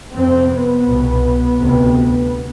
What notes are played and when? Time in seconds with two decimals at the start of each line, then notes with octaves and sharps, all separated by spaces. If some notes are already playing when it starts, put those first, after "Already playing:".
0.14 F2 C3 C4
0.50 B3
0.86 C2 B2
1.59 D2 C3